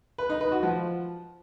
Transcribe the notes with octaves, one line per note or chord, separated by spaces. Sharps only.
B4
D#4
B4
F#4
F3